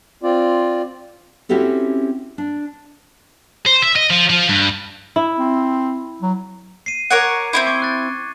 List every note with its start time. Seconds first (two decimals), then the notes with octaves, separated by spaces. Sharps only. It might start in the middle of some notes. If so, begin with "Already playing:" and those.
0.23 C4 F4 D5
1.49 C4 C#4 E4 F#4 G4 A4
2.38 D4
3.67 C5
3.82 E5
3.96 D#5
4.10 F3
4.30 F3
4.49 G2
5.16 E4
5.39 C4
6.22 F#3
6.86 C7 D#7
7.10 A#4 C#5 F#5 D6 G#6 C#7
7.53 C4 D#4 E4
7.67 C#6 D6 G#6
7.82 F#6 A6